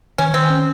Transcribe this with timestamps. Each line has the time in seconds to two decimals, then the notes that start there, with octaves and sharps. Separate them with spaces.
0.18 D#3 C#4
0.34 D#3 C4
0.50 C#4